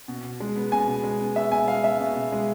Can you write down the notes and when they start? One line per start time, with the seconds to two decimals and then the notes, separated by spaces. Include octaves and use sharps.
0.08 B2
0.24 B2
0.40 G#3
0.56 B3
0.72 B2 G#5
0.88 B2
1.04 G#3
1.21 B3
1.36 B2 E5
1.52 B2 G#5
1.68 G#3 F5
1.84 B3 E5
2.00 B2
2.16 B2
2.32 G#3